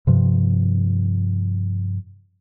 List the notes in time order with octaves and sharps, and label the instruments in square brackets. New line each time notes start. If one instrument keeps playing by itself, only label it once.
[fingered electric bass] G2 C3 F3